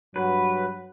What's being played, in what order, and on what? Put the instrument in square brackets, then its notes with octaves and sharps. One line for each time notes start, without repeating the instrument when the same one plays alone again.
[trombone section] G2 F#3 F#4 [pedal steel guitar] B4